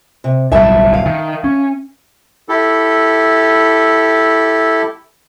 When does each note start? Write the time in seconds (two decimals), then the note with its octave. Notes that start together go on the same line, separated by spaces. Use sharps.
0.24 C3
0.52 D1 B1 G3 E5 A5
0.94 F5
1.06 D#3
1.44 C#4
2.49 E4 G4 A4